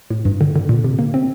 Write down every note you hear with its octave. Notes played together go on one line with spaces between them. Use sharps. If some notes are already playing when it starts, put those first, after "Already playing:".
A2
G2
D3
D3
A#2
C3
A#3
C4